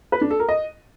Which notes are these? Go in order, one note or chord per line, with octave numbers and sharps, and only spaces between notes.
B4
D4
A4
A#4
D#5